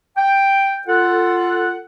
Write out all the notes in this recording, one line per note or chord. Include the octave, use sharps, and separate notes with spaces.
G5
F4 A4 F#5